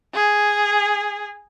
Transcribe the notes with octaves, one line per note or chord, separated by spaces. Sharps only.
G#4